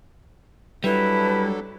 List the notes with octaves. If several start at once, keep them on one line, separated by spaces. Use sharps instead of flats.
F#3 G3 D4 E4 A4 B4